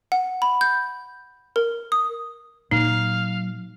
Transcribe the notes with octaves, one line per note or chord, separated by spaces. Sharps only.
F#5
B5
G6
A#4
D#6
A#2 F#3 D#4 F5